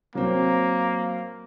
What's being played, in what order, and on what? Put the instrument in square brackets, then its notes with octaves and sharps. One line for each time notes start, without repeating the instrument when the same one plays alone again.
[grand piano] F#3 C4 [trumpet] A#3